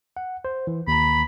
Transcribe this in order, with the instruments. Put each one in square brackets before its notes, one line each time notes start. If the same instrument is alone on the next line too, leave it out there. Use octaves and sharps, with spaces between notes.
[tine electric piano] F#5
C5
E3
[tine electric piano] D#2 A#5 [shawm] B5